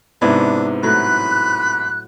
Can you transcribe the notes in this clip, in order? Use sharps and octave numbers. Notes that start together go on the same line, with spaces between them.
G#2 C3 B3 D4 E4
A2 F#3 B5 F#6